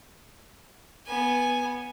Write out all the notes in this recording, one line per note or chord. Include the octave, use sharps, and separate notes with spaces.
B3 G#5